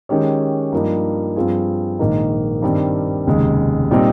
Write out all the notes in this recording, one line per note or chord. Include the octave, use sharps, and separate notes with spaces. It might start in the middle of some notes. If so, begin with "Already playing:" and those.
D#3 G#3 C#4 G4 C#5
G2 F3 A#3 D#4
G2 F3 C4 F4 G#4
A#1 G#2 D#3 A#3 D#4
G2 D#3 G3 C4
F1 D#2 C#3 G#3
A#2 G3 C4 D#4